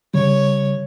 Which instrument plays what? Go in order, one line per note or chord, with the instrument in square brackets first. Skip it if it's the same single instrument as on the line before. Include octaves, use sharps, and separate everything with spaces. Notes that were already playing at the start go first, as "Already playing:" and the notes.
[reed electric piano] C#3 G3 [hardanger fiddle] C#5